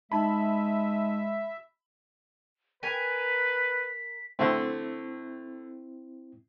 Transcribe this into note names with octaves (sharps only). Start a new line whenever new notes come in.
G#3 D#4 E5 A5 B5
A#4 B4 G#5 B6
D3 A3 C4 E4